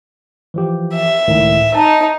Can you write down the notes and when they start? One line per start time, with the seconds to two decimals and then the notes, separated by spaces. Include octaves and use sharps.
0.54 E3 F3 G4
0.94 E5
1.28 C#2 A2 D#3
1.75 D#4 A5